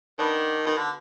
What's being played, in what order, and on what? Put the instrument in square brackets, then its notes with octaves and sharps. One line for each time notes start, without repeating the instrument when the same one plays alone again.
[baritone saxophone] D#3 [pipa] B3 D4
[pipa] B2 [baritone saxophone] D#3
[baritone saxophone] D3